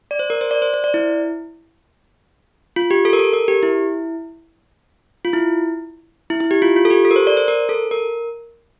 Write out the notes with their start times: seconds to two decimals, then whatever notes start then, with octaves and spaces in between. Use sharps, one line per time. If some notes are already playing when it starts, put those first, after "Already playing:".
0.11 D5
0.19 C5
0.30 A#4
0.41 C5
0.51 D5
0.62 C5
0.74 C5
0.84 D5
0.94 E4
2.76 F4
2.91 G4
3.05 A4
3.13 A#4
3.19 A4
3.33 A#4
3.48 G4
3.63 E4
5.25 F4
5.33 E4
6.30 E4
6.40 E4
6.51 G4
6.62 F4
6.76 F4
6.85 A4
6.90 G4
7.05 A4
7.11 A#4
7.16 C5
7.27 D5
7.37 C5
7.48 A#4
7.69 A4
7.91 A#4